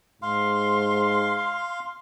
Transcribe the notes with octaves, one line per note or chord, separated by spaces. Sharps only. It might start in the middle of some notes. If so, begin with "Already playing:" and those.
G#2 F5 C6